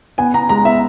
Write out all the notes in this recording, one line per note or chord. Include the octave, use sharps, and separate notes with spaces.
B3 G#5
B3 A#5
G#3 A#5
B3 E5